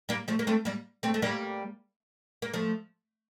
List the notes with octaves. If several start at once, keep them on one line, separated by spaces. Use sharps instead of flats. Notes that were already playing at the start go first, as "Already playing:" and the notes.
G3 A#3
F3 A3
A#3
A3 C4
G3 A#3
A3 C4
A3
G3 A#3
A#3
F3 A3